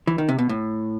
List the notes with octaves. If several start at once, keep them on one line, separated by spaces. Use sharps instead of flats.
E3
D#3
C3
B2
A2